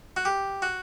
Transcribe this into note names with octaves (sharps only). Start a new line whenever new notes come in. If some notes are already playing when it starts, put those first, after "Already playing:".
F#4
G4
F#4